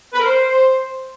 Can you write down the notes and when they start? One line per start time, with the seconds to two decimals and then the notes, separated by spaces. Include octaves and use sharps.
0.13 B4
0.20 A#4
0.26 C5